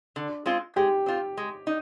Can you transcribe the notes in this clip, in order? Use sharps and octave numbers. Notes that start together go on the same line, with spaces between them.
D3
G#3 C4 F4
G#3 G4
C4 F4
G#3
D#4